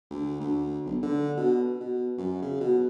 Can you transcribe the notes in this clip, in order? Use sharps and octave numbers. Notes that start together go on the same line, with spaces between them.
D2
D2
B1
D3
B2
B2
F#2
C#3
B2